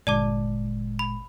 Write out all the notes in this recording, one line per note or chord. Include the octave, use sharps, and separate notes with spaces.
G1 A#2 G#3 D5 A5 D6
B5